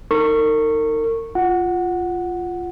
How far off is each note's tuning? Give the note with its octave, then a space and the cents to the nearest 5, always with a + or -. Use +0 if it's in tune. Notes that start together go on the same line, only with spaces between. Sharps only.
D#4 +5 A#4 -40 C#6 -10
F4 +0 F#5 +0